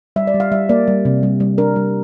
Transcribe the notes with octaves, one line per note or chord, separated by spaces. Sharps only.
G3 E5
D5
G3
F5
G3 E5
A#3 D5
G3
C3
G3
G3
D4 A#4
G3